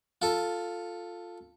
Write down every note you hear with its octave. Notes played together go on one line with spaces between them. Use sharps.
F4 A4